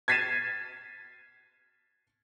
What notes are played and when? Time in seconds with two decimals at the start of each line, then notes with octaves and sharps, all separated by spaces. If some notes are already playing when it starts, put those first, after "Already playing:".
0.08 G#6 A6 B6 C7 D#7 E7